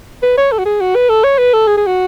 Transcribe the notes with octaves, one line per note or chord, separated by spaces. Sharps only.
B4
C#5
A4
F#4
G#4
F#4
B4
A4
C#5
B4
A4
G#4
G#4
F#4